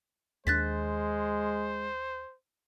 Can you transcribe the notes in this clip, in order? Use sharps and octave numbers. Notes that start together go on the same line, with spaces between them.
D#2 G#3 D4 C5 F#6 A6 B6